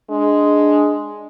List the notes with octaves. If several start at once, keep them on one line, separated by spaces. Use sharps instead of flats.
G#3 D4